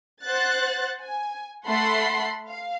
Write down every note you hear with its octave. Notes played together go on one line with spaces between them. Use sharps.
C5 F#5 F#6 A6
G#5
A3 A4 F#5 B5 C6 C7
F5